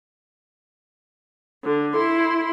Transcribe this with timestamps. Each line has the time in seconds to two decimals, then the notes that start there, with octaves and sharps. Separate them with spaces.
1.65 D3
1.95 E4 C6